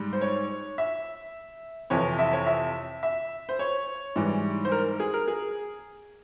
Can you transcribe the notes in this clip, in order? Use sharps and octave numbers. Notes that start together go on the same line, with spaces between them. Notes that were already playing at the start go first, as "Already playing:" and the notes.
Already playing: G#2 G3
C5
C#5
E5
F2 C3 E3 C#5
E5
C#5
E5
E5
C5
C#5
G#2 E3 G3
C5
A#4
G#4
A#4
G#4